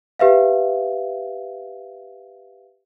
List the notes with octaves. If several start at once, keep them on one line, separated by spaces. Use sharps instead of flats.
G4 B4 E5 F5